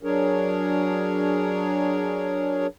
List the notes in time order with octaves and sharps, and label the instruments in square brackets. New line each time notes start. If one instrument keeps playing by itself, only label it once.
[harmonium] F#3 D4 G#4 A#4 C#5